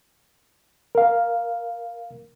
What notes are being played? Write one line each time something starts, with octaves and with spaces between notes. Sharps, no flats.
A#4 F5